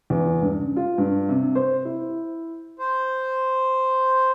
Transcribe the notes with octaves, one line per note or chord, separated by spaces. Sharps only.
E2
G2
C#3
F4
G2
C3
C5
E4
C5